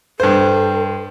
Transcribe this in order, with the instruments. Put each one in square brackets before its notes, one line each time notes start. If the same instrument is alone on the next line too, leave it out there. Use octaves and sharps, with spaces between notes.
[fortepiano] G2 C5 [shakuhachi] A4